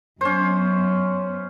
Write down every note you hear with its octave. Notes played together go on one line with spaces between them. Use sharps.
F#2 B3 C#4 C5